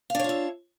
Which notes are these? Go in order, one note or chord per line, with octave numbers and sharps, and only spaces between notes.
D4 F4 C#5 E5 F5